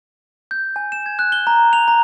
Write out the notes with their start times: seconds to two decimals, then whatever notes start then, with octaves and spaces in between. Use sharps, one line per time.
0.51 G6
0.76 G#5
0.92 E7
1.06 G#6
1.19 F#6
1.32 G7
1.47 A#5
1.73 F7
1.88 A#5